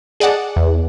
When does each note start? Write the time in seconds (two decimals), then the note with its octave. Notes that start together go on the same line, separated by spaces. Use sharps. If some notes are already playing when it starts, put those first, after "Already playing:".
0.20 G#4 D5 D#5 F#5 A5
0.56 E2